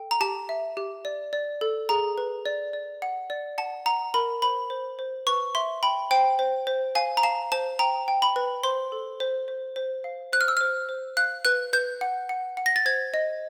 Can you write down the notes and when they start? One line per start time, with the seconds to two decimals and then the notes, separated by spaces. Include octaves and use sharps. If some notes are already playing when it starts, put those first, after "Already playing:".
Already playing: A4 G5
0.11 A#5
0.21 G4 A5
0.49 E5
0.77 G4
1.05 D5
1.33 D5
1.61 A4
1.89 G#4 A#5
2.18 B4
2.46 D5
2.73 D5
3.02 F#5
3.30 D5
3.58 F#5 A5
3.86 F#5 A#5
4.14 A#4 B5
4.42 C5 B5
4.70 C5
4.99 C5
5.27 B4 C#6
5.55 E5 C6
5.83 G5 B5
6.11 C5 G5
6.39 C5
6.67 C5
6.95 F5 G#5
7.17 A#5
7.23 F5 A5
7.52 C5 A5
7.79 G5 A#5
8.08 G5
8.22 B5
8.36 B4
8.63 C5 C6
8.92 A4
9.20 C5
9.48 C5
9.76 C5
10.04 F5
10.33 C5 F#6
10.41 F6
10.48 E6
10.57 C5 F6
10.89 C5
11.17 F5 F#6
11.45 B4 F#6
11.73 B4 G6
12.01 F#5
12.29 F#5
12.57 F#5
12.66 A#6
12.76 A6
12.86 C5 G#6
13.14 D#5